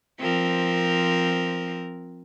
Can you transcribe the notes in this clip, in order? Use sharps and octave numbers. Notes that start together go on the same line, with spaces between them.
F3 C4 A#4